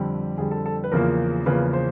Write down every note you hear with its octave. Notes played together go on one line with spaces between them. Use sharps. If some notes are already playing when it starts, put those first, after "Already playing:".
Already playing: F2 D3 G3
F2 D3 G3 G#4
A4
A4
B4
E2 C#3 F3 A#3 A#4
E2 C#3 F3 A#3 B4
C5